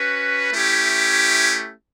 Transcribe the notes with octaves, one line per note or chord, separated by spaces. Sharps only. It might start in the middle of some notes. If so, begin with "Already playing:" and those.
Already playing: C#4 F#4 B4
A3 C#4 E4 G4